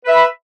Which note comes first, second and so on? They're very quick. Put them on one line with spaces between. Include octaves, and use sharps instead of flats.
B4 E5 B5